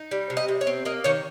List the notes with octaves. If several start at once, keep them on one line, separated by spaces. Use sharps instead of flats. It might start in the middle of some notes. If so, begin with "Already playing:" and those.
Already playing: D#4
G3
C3
D#5
C3
C#5
C4
A#3 D#5
D#3 C#5